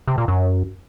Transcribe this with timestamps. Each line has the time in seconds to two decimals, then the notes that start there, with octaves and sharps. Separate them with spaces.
0.08 C3
0.18 A#2
0.28 F#2